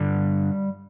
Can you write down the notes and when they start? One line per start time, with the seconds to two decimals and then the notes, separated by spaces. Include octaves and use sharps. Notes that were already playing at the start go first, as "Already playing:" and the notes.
Already playing: G2 D3 G3